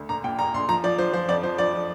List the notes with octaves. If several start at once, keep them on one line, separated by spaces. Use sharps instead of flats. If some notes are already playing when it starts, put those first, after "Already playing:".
Already playing: D2
A#1 A#5
A#2 G5
A#1 A#5
A#1 C6
F3 A#5
F3 D5
F3 C5
F3 C5
F2 D5
F3 C5
F3 D5
F3